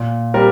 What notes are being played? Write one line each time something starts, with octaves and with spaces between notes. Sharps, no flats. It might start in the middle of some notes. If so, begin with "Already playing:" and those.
Already playing: A#2
G3 C4 G4 A#4